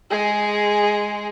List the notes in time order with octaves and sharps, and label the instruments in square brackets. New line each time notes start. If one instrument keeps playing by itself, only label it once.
[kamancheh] G#3 G#4